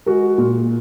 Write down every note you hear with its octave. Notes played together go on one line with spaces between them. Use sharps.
G#3 F#4 A#4
A#2